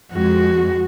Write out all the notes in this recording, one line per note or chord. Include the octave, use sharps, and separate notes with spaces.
F2 G#3 F#4